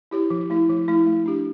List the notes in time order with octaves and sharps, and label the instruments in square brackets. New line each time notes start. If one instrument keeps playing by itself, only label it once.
[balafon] E4 G4 C#5
F3
A3 E4
F3
A3 E4
A3
D4 G4